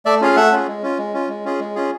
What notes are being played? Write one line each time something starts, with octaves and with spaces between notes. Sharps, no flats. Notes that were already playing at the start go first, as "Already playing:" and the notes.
A3 D5 E5
C#4 F4 G#4 F5
A3 E5 F#5
C#4 F4 G#4
G#3
C#4 F4
G#3
C#4 F4
G#3
C#4 F4 G#4
G#3
C#4 F4 G#4